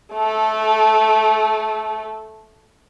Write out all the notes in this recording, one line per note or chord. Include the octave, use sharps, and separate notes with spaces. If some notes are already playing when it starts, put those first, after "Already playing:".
A3 A4